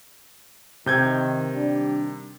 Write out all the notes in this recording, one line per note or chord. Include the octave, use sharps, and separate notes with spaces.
C3 D#3 G6 G#6
D#3 G3 D4